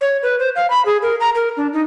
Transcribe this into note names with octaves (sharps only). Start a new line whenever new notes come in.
C#5
B4
C5
F5
B5
G#4
A#4
A#5
A#4
D4
D#4